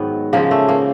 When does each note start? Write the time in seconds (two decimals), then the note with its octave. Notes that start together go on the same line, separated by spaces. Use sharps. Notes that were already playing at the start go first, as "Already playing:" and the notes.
Already playing: G#2 D#3 F#3 B3
0.33 C#3 F3 G#3 A#3
0.51 A3
0.69 A#3